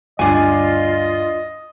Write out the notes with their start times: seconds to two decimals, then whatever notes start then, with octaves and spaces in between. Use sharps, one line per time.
0.19 D2 G2 D4 F4 D#5 G#5